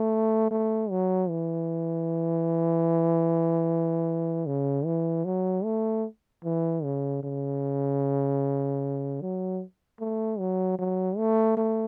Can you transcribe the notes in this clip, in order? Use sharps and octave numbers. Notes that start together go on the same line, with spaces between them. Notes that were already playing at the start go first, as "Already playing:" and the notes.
Already playing: A3
A3
F#3
E3
C#3
E3
F#3
A3
E3
C#3
C#3
F#3
A3
F#3
F#3
A3
A3